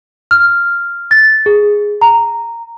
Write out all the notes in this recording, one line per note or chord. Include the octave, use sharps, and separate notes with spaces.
F6
A6
G#4
A#5